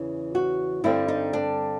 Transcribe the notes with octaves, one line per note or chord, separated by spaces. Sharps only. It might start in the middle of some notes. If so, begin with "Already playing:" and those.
Already playing: E2 C#3 E3
F#4
G2 D3 G3 C4 E4
D#4
D4